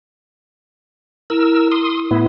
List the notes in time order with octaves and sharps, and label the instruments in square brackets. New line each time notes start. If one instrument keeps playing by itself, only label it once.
[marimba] E4 [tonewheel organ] A#4 E6
[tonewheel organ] C6 D#6
A2 B3 E4